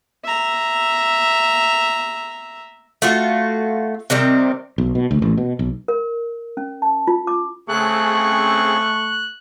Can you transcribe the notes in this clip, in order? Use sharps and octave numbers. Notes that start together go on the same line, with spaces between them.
E5 A#5
A3 F4 F#4
C3 D#3 G3 C4
B1
B2
D2
A1
B2
B1
A#4
C#4
A5
F4
D6
C#3 A3 C4 G#4 C#6 F#6